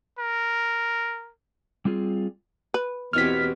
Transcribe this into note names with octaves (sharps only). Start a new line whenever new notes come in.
A#4
G3 C4 F4 G#4
B4
E2 B2 C4 E4 G4 C#5 F6 B6